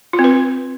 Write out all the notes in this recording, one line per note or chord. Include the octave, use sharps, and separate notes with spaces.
F4
C4
B4